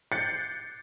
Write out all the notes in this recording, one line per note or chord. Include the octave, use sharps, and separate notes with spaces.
F#6 G6 A6 C7 C#7